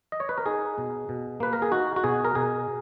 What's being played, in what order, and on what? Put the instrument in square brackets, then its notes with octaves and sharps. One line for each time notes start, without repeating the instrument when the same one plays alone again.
[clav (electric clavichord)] D#5
C#5
B4
A#4
D#4 G#4
B2
B2
A#3 B4
A#4
G#4
D#4 F#4
F#4
B2 G#4
A#4
B2 G#4